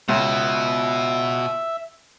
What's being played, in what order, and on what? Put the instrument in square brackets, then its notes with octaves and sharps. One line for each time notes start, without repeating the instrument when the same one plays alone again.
[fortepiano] C#2 [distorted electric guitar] B2 [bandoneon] E5